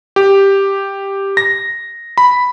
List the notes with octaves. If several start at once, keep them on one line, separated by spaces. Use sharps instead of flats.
G4
A#6
B5